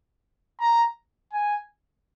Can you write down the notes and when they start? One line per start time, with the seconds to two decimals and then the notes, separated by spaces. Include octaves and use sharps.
0.60 A#5
1.33 G#5